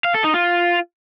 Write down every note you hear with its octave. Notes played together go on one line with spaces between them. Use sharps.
F5
A4
D#4
F4